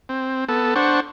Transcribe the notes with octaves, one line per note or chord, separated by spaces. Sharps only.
C4
B3 A4
D4 C5 F#5 C#6